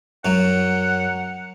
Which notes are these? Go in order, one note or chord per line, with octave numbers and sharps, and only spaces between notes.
F#2 F#3 F#5